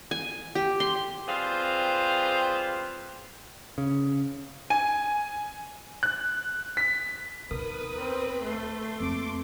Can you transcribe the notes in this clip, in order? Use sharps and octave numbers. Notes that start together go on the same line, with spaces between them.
G#5
G4
C6
G3 C4 F4 G#4 B4 C5
C#3
G#5
F#6
B6
D#2 B2 A#4 B4 D#6
C4
A3 C6
F2 A#3 D6